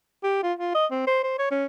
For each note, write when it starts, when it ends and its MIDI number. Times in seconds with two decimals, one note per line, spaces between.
0.24 0.39 67
0.43 0.53 65
0.59 0.73 65
0.75 0.86 75
0.91 1.05 60
1.07 1.23 72
1.23 1.35 72
1.39 1.48 73
1.51 1.66 61